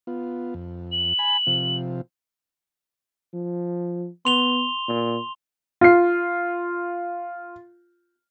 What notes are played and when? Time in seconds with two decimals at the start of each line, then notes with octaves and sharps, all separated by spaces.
0.07 B3 F4
0.54 F2
0.92 F#7
1.19 G#5 B5
1.47 C3 F3
3.33 F3
4.25 B3 C6 F7 G7
4.88 A#2
5.81 F4 C7